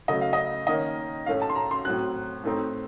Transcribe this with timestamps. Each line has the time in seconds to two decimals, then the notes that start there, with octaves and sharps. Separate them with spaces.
0.08 C#3 F#3 A3 D#5
0.21 F5
0.33 D#5
0.67 D#3 A#3 C#4 D#5
1.26 A2 A3 C#4 F5
1.42 A5
1.50 C6
1.55 A#5
1.71 C6
1.85 A2 F#3 C4 F#6
2.44 A2 A3 C4 D#4